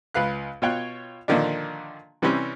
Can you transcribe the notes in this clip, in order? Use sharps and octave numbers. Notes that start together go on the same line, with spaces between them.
C#2 B4 F5 F#6
B2 F4 C#5 G5 F#6
A#2 D3 D#3 F3 D4
C3 E3 G3 C4 C#4